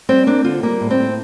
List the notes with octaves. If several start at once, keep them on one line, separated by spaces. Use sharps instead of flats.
G3 C4
A#3 D4
D3 F4
G3 A#3
A2
C4
A2